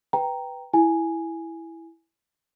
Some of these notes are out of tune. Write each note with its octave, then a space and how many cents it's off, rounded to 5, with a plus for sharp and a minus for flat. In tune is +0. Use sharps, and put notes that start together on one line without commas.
B4 +0 G5 +0 A#5 +0
E4 +0 G#5 +0